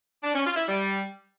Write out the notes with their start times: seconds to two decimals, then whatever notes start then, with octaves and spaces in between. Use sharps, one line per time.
0.23 D4
0.34 C#4
0.45 F4
0.56 E4
0.67 G3